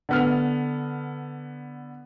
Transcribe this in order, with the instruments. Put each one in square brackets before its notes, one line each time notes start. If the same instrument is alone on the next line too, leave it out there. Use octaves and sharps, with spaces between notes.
[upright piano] D3 B3 F6